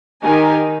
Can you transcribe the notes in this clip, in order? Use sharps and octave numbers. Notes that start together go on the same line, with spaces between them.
D#3 D#4 G4 A#4 D#5 G#5